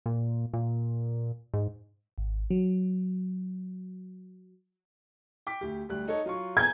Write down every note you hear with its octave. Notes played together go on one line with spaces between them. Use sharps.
A#2
A#2
G#2
G#1
F#3
G5 D6 B6
D2 G4
D2 G3 F#6
D#4 A4 C#5
F#3 F4 C#6
G#5 A#5 G6 G#6